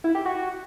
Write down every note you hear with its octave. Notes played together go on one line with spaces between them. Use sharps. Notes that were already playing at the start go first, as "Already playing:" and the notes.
E4
G4
F#4